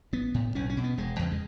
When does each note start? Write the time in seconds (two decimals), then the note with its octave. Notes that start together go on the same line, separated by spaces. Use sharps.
0.13 A1 B3
0.34 A2
0.55 B1 C#4
0.70 C#4
0.77 B2
0.84 B3
0.98 E1 G#3
1.19 E2 C#3
1.32 G#3